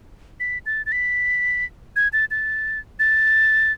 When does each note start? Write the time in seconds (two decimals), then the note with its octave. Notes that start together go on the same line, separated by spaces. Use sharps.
0.40 B6
0.66 A6
0.86 A6
0.92 B6
1.96 G#6
2.13 A6
2.31 A6
2.99 A6